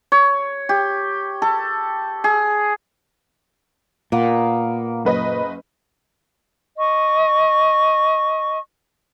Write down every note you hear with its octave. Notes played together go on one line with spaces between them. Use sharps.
C#5
G4
A4
G#4
A#2 A#3 B3
F#1 B4 D#5
D#5 C#6